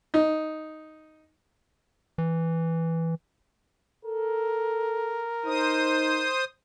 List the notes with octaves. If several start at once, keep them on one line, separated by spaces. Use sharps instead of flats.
D#4
E3
A4 A#4
D#4 C5 D#6